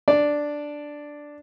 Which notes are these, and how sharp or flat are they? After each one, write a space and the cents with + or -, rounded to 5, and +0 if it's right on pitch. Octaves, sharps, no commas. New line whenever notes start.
D4 +0 D5 +0